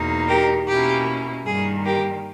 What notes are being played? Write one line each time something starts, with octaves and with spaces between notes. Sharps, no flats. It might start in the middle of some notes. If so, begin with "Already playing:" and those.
Already playing: E2 B2 A#3 D#4
G4 A#4
B2 A#3 C#4 E4 G4
G2 D#3 G3 A#3 G#4
G4 A#4